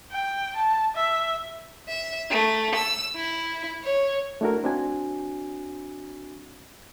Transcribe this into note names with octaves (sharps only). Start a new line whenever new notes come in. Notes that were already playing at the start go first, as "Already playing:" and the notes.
G5
A5
E5
E5
A3
E6
E4
C#5
A3 D4 E4 F#4 A#4
C4 D4 F#4 G#5